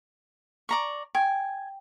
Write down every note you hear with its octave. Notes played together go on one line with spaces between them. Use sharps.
D5 A#5 C#6
G5 G#5